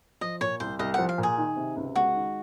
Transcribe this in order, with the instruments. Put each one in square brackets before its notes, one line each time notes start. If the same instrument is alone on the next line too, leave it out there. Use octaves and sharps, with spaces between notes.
[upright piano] F3 [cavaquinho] D#5
[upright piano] A#2 [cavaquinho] C#5
[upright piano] C2 [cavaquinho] C5
[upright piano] C2 [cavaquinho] D#5
[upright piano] F3 [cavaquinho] F#5
[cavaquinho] F5
[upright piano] A#2
[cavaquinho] G#4
[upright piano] D#3
C3
C#2
[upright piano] G#3 [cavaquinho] F#4
[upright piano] D#3